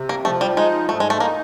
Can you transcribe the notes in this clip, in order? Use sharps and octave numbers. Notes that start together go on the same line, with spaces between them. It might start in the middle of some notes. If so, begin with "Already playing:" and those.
Already playing: C3
A#3
F3 A3
G3
G#3 D#4
G#2 A3
G#3
A3
A#3 D#4